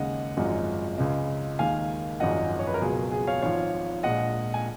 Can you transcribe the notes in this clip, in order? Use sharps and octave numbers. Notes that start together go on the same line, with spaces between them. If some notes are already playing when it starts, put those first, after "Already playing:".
Already playing: D#2 C#3 G#3 D#5 F#5
G#1 F#2 F3 G#3
C#2 C#3 G#3
D#2 D#3 G#3 F5 G#5
G#1 F#2 F3 G#3 D#5 F#5
C#5
B4
A#4
C#2 B2 F#3 G#4
G#4
C#5 F5
G#1 G#2 F3 C#5 F5
A#1 A#2 G#3 D#5 F#5
G#5